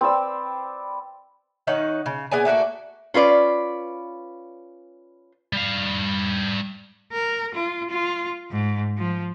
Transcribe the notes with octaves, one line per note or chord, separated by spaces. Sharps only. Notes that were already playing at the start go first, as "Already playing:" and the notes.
C4 B4 D5 E6
D#3 C#4 D#4 F#5
C#3
B3 G#4 D5 G#5
A3 A#3 F#4 D5
C#4 F4 B4 D5
G3 F5
A#4
F4
F4
G#2
F3